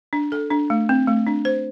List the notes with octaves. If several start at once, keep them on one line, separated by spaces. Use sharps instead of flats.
D4
A4
D4
A3
C4
A3
D4
C5